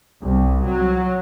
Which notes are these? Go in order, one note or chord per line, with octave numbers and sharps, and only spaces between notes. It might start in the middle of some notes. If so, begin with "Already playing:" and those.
C2
F#3